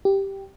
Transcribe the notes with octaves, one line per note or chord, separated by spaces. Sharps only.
G4